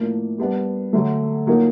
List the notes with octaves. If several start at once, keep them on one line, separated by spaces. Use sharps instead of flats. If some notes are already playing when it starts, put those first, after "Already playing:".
Already playing: A2 F3 A#3 D4
G3 B3 D4
D3 F#3 A3
A#2 F#3 A#3 D#4